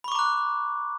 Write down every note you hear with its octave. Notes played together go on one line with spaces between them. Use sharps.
A#5 B5 C#6 D6 F#6